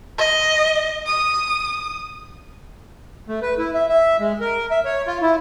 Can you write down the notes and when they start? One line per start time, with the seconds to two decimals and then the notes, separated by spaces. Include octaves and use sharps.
0.18 D#5
1.06 D#6
3.28 A3
3.42 B4
3.58 E4
3.74 E5
3.89 E5
4.20 G#3
4.41 A#4
4.71 E5
4.85 C#5
5.07 F4
5.22 E4